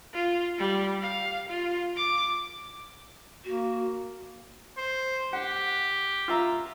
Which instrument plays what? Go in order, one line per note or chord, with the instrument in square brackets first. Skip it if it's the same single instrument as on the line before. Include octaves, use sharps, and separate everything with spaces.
[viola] F4
G3
F5
F4
D6
[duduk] A#3 [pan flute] F#4
[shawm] C5
[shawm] G4 [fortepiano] F#5
[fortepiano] F4 E5 A#5